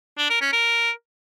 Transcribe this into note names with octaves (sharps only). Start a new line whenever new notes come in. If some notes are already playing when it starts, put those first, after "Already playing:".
D4
A#4
C#4
A#4